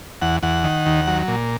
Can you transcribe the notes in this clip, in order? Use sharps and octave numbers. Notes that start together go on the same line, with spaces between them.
E2 F#5
E2 F#5
D#3
D#2
F#3
A#2